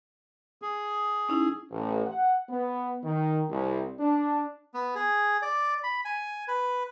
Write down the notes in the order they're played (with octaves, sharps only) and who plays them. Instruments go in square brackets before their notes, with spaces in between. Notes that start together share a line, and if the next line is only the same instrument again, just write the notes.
[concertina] G#4
[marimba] C#4 D#4 E4
[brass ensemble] A1
F#5
B3
D#3
C2
D4
[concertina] B3
G#4
D5
B5
G#5
B4